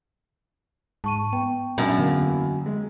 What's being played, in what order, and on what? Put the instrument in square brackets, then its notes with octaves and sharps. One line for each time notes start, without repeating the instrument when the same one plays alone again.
[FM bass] G#2 [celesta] A5 C#6 D#7
[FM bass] B3 [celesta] G5
[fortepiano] B1 D4 E5 [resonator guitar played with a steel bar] F#2 [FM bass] A#2
[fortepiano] E2 A#3 [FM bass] D3
[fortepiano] G#3